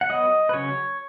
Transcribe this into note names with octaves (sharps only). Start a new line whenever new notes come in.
F#5
F#3 B3 D#5
B4
C#3 F#3 C#4 C#5